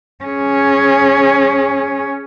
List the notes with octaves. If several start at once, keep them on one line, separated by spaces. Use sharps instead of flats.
C#4 G#4